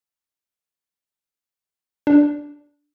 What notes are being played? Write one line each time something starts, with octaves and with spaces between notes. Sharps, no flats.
D4